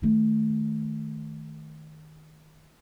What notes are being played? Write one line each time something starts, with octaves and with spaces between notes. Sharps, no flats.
D#3 A3